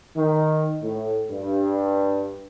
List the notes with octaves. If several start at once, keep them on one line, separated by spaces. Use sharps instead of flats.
D#3
A2
G2